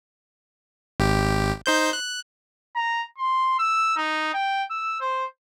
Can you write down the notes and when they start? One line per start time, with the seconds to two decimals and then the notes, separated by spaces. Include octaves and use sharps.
1.00 G#1 G4
1.66 D#4 C5 G6
1.93 F#6
2.76 A#5
3.18 C6
3.59 E6
3.97 D#4
4.34 G5
4.70 E6
5.00 C5